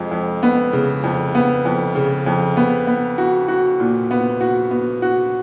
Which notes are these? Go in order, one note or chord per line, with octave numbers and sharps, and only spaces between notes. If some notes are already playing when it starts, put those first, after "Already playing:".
Already playing: F2 G#3
F2
B3
C#3
F2
B3
F2
C#3
F2
B3
B3
F#4
F#4
A#2
B3
F#4
B3
F#4